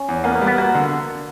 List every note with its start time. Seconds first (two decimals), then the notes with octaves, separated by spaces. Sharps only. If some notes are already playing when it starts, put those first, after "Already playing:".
Already playing: C#4
0.09 E2
0.24 A#3 B3
0.35 A#3
0.41 G3
0.47 B3
0.58 A#3 F#4
0.75 D3